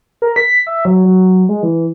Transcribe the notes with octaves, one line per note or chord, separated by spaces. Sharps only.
A#4
B6
E5
F#3
F#3
G#3
E3